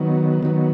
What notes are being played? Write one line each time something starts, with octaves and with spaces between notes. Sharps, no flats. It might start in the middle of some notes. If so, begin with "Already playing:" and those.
Already playing: D#3 F#3 B3
D#3 F#3 B3